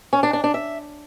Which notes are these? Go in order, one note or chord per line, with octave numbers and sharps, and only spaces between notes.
C#4
D4
D4
D4
E5